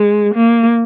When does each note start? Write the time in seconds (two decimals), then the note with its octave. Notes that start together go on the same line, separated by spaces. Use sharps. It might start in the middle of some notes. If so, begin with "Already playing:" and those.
Already playing: G#3
0.35 A#3